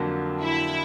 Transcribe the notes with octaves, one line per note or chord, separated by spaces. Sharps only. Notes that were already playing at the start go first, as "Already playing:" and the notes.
Already playing: F2 D3 F#3 A#3
E4